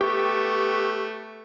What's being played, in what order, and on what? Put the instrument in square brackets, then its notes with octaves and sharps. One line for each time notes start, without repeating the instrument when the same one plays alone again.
[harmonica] A3 B3 [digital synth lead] G4 [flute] C#6